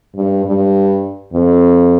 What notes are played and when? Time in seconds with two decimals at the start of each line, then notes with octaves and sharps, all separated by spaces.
0.15 G2
0.44 G2
1.32 F2